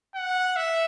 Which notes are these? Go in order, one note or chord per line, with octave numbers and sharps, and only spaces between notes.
F#5
E5